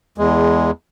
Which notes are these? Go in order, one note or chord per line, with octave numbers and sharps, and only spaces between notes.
E2 G#3